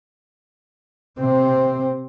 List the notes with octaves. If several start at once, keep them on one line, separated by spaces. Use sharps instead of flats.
C3 C4